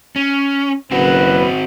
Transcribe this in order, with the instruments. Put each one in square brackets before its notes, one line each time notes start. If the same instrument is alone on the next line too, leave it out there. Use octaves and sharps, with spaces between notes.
[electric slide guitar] C#4
[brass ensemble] F#1 B4 [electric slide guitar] C4 F#4